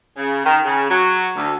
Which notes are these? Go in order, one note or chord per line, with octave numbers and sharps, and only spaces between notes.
C#3
D#3
C#3
F#3
D2